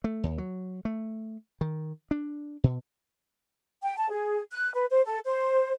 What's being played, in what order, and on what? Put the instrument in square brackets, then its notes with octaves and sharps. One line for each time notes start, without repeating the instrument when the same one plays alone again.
[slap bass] A3
D#2
F#3
A3
D#3
D4
B2
[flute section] G5
A5
G#4
F#6
B4
C5
A4
C5